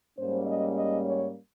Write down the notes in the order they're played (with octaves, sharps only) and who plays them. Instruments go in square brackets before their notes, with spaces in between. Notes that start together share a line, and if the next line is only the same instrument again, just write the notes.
[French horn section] G#2 G3 A#3 C#4 C5
D#5
D#5
C#5